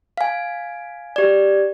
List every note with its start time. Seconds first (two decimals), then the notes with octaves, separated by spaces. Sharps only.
0.17 F5 G#5
1.16 G4 D5